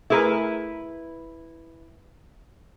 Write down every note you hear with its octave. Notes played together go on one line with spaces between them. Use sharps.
A3 E4 G#4 A#4 B4